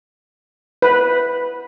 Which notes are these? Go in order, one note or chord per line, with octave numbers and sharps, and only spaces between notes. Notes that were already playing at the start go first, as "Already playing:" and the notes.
B4